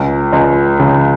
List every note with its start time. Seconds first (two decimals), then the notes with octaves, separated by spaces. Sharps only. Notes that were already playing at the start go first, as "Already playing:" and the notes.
Already playing: C#2
0.33 C#2
0.79 C#3